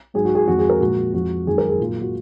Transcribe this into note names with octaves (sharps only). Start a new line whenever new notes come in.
G#2 F#3 G#4
F#4
G#4
F2 D#3 G#3 F#4
G#4
A#4
A#2 F3 G#3 F#4
F2 F3 G#3 F#4
F#2 D#3 G#3 G#4
A#4
G#4
A#2 F#3 F4
F#4